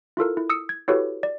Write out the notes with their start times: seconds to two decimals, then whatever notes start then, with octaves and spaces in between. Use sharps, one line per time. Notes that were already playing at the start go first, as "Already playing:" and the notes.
0.17 E4 F4 A4 A#4
0.37 E4
0.50 D#6 E6 C#7
0.69 G#6
0.88 E4 F#4 G4 A4 B4 C#5
1.23 D5